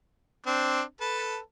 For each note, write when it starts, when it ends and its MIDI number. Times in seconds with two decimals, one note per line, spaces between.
0.46 0.82 60
0.46 0.82 62
1.01 1.38 69
1.01 1.38 71
1.01 1.38 81